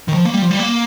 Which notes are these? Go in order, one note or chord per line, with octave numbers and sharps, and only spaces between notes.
D#3
F3
A#3
G3
F3
G3
A#3